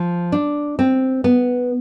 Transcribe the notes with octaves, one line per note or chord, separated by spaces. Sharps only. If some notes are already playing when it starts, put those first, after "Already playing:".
Already playing: F3
D4
C4
B3